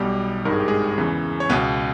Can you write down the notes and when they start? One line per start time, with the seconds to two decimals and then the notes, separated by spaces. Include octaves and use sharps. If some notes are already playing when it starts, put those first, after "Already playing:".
Already playing: B1 B2 G3 G4
0.45 G#1 G2 D#3 A#4
0.52 G#4
0.60 G4
0.68 G#3 G#4
0.98 E2 C#3 E3
1.40 C#5
1.50 C#2 B2 B3 B4